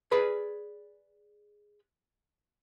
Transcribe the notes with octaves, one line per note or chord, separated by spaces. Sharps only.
G#4 B4 D5 B5